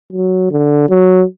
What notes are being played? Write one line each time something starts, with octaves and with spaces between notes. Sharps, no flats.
F#3
D3
F#3